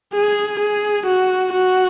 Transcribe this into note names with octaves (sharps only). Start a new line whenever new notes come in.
G#4
G#4
F#4
F#4